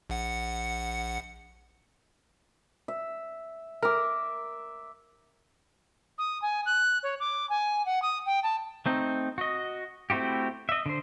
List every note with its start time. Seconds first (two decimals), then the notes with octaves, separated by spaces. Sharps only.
0.10 A#1 F#5 C#7
2.88 E5
3.82 A#4 E5 D6
6.18 D#6
6.42 G#5
6.66 F#6
7.03 C#5
7.20 D6
7.49 G#5
7.86 F#5
8.02 D#6
8.26 G5
8.43 A5
8.86 A3 C4 D#4
9.38 F#4 D#5
10.10 A3 C4 E4 F#4 G4
10.69 D#5 E5
10.86 D3 C5